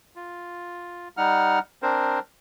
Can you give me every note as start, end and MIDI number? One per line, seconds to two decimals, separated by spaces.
0.16 1.08 65
1.17 1.59 55
1.17 1.59 63
1.17 1.59 78
1.17 1.59 89
1.83 2.19 60
1.83 2.19 62
1.83 2.19 70
1.83 2.19 72